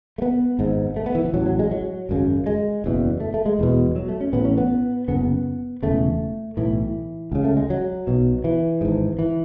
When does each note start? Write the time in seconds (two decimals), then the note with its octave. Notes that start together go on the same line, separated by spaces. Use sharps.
0.18 A3
0.22 B3
0.59 G#1 G#2
0.96 A3
1.06 B3
1.15 E3
1.25 E3
1.34 A1 A2 F#3
1.46 F#3
1.59 G#3
1.71 F#3
2.09 G#1 F#2 C#3
2.46 G#3
2.84 F#1 E2 B2
3.20 A3
3.34 A3
3.46 G#3
3.59 E1 E2 B2
3.96 F#3
4.09 A3
4.21 C#4
4.33 A1 A2 B3
4.45 C#4
4.57 B3
5.08 F#1 F#2 C#3 B3
5.82 E1 E2 C#3 A3
6.57 B1 A2 E3
7.32 C#2 C#3
7.44 A3
7.57 G#3
7.70 F#3
8.07 B1 B2
8.44 E3
8.81 G#1 G#2
9.19 E3